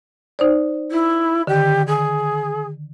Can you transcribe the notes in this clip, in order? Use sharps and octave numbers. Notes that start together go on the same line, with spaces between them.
D#4 C5 D5
E4
D3 D#3 G4
G#4